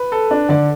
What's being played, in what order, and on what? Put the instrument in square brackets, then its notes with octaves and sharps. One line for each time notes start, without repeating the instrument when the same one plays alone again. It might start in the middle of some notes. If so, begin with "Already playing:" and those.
Already playing: [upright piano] B4
[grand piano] A4
D4
[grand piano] D3 [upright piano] D5